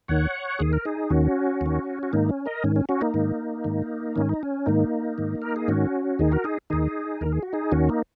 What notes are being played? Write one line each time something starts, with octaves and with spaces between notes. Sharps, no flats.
D#2 D#3 C#5 F#5
D#2 D#3 G#4
A#4
D#4 G#4
D#2 D#3 C#4 F#4
D#2 D#3
F#4
G#2 D#3 A#3 D#4
C#4
A#4 D#5
G#2 D#3 C#4
C#4
C#4 F#4
A#3 D#4
G#2 D#3
G#2 D#3
G#2 D#3 C#4
D#4
C#4
G#2 D#3 A#3 D#4
G#2 D#3
A#4
G#4
G#2 D#3 C#4 F#4
D#2 D#3 D#4 G#4
F#4 A#4
D#4 G#4
D#2 D#3 D#4 G#4
D#2 D#3 A#4
G#4
F#4
D#4 G#4
D#2 D#3 C#4 F#4
A#3 D#4